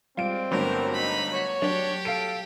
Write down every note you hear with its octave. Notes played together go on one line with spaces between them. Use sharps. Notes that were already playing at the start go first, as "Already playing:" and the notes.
G3 G#3 C4 F4 D5 D7
G1 G2 F#3 A3 B3 A#4
D#4 B5
F#4 C#5
F#3 D4 G4
A4 F5 D7